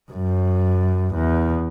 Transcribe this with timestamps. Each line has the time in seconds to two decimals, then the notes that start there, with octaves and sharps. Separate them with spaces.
0.11 F#2
1.15 E2